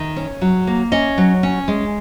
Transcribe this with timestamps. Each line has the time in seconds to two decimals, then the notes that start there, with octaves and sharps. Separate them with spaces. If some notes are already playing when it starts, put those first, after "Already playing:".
Already playing: D#3
0.16 C#4
0.42 F#3
0.67 A#3
0.92 C#4 D#5
1.18 F#3
1.43 C#4
1.68 G#3